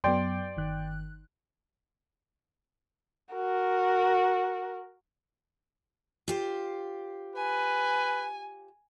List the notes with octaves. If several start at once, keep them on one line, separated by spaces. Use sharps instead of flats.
F#2 F#3 B3 D5 G5 C6
G1 D#3 F#6
F#4 A#4
F4 G4 C5
B4 G#5